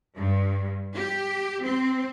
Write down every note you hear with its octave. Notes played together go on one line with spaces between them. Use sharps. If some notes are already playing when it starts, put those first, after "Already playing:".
G2
G4
C4